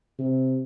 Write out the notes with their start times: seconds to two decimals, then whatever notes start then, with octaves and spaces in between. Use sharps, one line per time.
0.18 C3